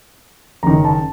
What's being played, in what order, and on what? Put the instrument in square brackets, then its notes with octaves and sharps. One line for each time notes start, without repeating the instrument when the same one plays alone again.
[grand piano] F#1 F#2 D#3 A#5
A5